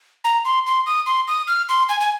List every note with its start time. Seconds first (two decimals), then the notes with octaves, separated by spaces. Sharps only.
0.24 A#5
0.45 C6
0.66 C6
0.86 D#6
1.06 C6
1.28 D#6
1.48 F6
1.69 C6
1.89 G#5
2.00 G#5